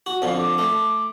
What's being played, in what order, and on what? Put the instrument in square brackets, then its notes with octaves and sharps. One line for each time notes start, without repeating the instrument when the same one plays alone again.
[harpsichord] F#4
[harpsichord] F2 D3 [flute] F5
[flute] D6
[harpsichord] A3